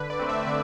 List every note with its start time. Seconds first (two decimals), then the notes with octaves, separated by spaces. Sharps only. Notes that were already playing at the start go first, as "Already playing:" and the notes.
Already playing: D3 B4
0.10 D5
0.19 A3 C4
0.29 E5
0.47 D3 D5